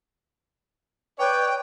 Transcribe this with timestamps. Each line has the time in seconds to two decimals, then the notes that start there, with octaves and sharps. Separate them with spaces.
1.19 B4 C#5 D5 G5